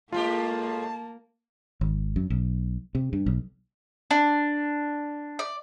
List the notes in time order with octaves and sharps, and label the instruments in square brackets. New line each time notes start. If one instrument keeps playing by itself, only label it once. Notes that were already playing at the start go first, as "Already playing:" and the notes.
[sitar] A2 G#3 G4 [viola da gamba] A#3 [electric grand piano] F4 [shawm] A5
[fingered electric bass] G#1
F#2
B1
C3
G2
B1
[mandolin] D4
D5